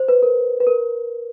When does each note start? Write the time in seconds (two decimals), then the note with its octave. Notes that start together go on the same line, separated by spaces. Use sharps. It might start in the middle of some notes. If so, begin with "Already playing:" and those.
Already playing: C5
0.08 B4
0.23 A#4
0.60 B4
0.67 A#4